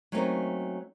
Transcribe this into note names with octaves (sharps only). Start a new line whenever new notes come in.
F#3 A3 A#3 C4 C#4 D#4